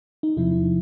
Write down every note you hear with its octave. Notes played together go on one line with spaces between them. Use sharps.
D#4
E2 C3 F3 E4